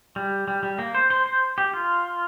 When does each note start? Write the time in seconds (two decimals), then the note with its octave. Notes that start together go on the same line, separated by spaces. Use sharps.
0.16 G3
0.48 G3
0.63 G3
0.79 A#3
0.95 C5
1.10 C5
1.26 C5
1.58 G4
1.74 F4